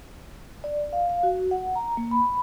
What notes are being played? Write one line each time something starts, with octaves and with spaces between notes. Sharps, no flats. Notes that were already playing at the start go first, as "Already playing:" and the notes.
D5
F5
F5
F#4
F#5
A#5
A#3
B5